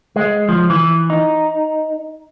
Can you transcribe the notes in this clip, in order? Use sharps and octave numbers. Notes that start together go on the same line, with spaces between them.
G#3
F3
E3
D#4